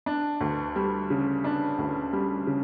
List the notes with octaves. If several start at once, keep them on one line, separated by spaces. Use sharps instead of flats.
D4
D2
G3
C#3
D4
D2
G3
C#3